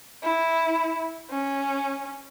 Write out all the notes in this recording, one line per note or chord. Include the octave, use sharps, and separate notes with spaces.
E4
C#4